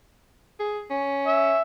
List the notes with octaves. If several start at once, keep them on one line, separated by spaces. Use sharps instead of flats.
G#4
C#4
E5